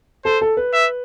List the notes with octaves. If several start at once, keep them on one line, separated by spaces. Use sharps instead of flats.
A4 C5
A4
B4
E5